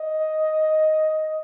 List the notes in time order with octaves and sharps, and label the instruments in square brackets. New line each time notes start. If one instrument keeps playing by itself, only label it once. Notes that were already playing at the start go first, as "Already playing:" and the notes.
Already playing: [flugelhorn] D#5